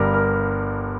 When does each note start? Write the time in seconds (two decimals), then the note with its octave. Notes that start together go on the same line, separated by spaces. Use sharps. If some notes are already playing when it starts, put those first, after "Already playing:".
Already playing: G1 G2 G3 A#4
0.14 A#4